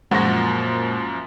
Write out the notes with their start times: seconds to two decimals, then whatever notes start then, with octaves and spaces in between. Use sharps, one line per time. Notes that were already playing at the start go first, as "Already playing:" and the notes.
0.11 F#2 A#2 F3 G#3 F#4 A#6